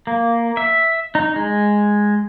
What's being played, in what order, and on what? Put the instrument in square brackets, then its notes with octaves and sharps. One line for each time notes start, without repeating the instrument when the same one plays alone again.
[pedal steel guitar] A#3
E5
D#4
G#3